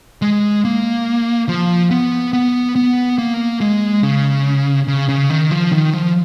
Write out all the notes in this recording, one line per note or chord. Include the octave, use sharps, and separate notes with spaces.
G#3
A#3
F3
B3
B3
B3
A#3
G#3
C#3
C#3
C#3
D#3
F3
D#3
F3